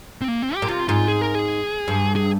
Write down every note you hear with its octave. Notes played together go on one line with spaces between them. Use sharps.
C4
A#3
C4
G4
A#2
C3 F4
G#2 F4
G#4
A#4
G#4
G2
G#4